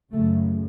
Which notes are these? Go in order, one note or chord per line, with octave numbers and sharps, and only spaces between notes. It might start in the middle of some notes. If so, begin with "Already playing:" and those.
F#2 C#3 A3